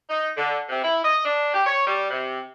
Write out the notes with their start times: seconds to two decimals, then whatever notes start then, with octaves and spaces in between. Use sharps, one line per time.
0.10 D#4
0.37 D3
0.69 C3
0.83 E4
1.04 D#5
1.25 D4
1.53 G4
1.67 C#5
1.87 G3
2.10 C3